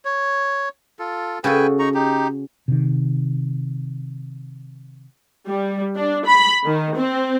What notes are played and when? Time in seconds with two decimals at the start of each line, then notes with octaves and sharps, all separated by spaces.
0.05 C#5
0.99 F4 A4
1.44 C#3 F#4 A4 B4 G5 G#5
1.79 D#4 A#5 C#6
1.94 D#4 G4
2.68 C3 D#3
5.48 G3
5.96 D4
6.26 B5
6.65 D#3
6.96 C4